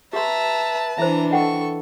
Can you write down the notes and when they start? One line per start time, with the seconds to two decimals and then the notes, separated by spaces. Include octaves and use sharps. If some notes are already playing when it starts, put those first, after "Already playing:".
0.13 G4 B4 E5 A5 A#5 C6
0.98 E3 D4 C5 E5 A#5
1.31 A4 D#5 F#5 G5 C#6